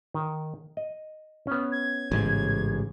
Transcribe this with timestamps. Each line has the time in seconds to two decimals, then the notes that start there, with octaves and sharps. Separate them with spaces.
0.14 D#3
0.77 D#5
1.47 B3 C#4
1.71 G#6
2.12 A1 G#2 C#3